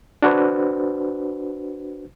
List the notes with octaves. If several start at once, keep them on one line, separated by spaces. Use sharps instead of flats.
D4 F#4 B4 C5